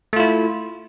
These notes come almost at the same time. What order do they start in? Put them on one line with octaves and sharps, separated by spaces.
A3 F4 E4